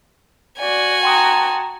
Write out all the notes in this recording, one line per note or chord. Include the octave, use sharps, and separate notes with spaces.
F#4 D5 G#5
G5 A5 A#5 C6 D#6